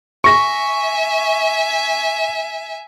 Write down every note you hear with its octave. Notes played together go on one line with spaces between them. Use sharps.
E5 G#5 C#6 A#6